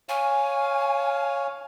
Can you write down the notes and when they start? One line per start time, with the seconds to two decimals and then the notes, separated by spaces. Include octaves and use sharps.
0.09 C#5 F5 G#5